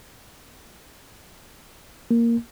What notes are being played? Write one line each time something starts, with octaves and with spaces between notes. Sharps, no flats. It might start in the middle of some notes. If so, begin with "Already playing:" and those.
A#3